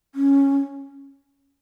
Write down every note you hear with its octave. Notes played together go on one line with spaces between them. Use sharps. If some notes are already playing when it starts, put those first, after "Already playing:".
C#4